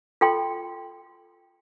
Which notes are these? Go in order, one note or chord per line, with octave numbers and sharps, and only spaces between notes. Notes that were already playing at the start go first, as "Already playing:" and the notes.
F4 A4 G5 C6